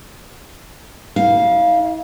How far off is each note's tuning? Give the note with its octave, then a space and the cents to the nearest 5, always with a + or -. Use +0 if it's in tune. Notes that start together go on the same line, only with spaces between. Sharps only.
E4 -45 F5 +0